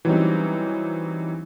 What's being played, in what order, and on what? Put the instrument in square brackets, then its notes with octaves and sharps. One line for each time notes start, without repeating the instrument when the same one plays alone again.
[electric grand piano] E3 F#3 G3 C4 C#4 D#4